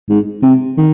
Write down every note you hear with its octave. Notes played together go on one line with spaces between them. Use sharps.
G#2
C3
D#3